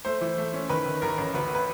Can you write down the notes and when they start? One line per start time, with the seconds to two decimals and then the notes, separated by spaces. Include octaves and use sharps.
0.05 A3 C5
0.21 E3
0.38 A3
0.54 C#4
0.70 D#3 B4
0.86 D#3
1.02 A1 A#4
1.18 A1
1.34 D2 B4
1.55 B4